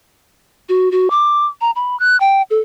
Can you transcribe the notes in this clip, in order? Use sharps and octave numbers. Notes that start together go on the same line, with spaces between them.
F#4
F#4
D6
A#5
B5
F#6
G5
A4